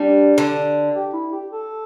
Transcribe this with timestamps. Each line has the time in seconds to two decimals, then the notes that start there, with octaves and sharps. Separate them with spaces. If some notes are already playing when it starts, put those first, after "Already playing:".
Already playing: G3 D4
0.38 D3
0.95 G4
1.13 E4
1.32 G4
1.51 A4